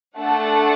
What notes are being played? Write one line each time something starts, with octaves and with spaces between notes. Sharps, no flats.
A3 D4 A4 F#5 A5